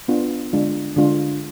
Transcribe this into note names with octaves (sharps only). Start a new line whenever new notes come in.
B3 D4 F4
D3 G#3 D4 F4
D3 G#3 D4 F4